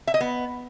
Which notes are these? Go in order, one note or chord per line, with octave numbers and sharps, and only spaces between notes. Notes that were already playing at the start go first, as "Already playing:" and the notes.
E5
D#5
B3